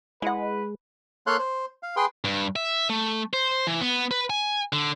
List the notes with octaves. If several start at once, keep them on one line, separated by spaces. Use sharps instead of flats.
G#3 E4 B4 F#5
A#3 A4 C#5 F5 C6 F#6
C5
F5
G#4 B4 G5 C6
G2
E5
A3
C5
E3
B3
B4
G#5
D3